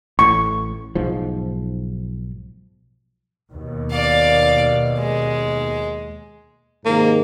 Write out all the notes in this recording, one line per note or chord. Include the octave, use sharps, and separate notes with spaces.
A1 A2 C#6
B1 G#2 F3
D#2 B2
D5 F5
G#3
G#2 C3 D#3 A#3